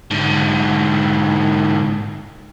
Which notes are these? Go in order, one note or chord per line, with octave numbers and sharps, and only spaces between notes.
G#2 D3